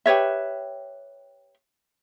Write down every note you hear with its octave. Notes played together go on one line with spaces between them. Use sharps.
G4 B4 C#5 E5